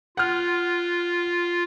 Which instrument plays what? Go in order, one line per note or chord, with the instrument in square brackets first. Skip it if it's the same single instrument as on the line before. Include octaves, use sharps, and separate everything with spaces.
[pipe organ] F4 [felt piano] F#5 F6